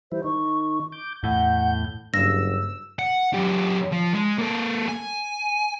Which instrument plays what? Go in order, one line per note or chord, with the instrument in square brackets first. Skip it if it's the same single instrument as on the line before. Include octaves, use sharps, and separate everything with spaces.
[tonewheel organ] E3 G3 E4 [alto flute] C5
[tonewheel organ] D#3 D#4 [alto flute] C#6
[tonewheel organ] D6 G6
[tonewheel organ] E2 G6 [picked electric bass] A2 [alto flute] F#5
[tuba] F#1 [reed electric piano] G2 [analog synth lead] E6 [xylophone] A#6
[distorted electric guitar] F#5
F#2 G4
F3
G#3
A#3 A4
G#5